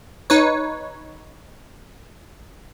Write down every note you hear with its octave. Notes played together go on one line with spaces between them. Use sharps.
D#4 B4 C#5